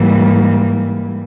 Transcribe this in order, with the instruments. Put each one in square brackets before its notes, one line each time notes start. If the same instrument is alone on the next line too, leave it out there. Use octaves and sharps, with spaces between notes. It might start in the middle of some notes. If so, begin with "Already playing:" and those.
Already playing: [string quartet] G#2 E3 G3 A#3